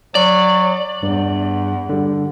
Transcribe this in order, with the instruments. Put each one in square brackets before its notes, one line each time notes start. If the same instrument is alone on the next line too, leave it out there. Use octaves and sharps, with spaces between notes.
[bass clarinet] F#3 [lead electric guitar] D5
[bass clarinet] E2 [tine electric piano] G2
[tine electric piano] D3 G3